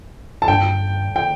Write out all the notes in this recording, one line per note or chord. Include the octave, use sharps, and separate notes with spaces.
A5
G2 G5
G5